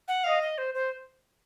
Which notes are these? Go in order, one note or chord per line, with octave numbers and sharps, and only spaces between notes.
F#5
D#5 F5
D#5
C5
C5